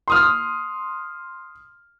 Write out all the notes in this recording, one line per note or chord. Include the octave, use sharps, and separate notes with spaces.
C6 D#6 F6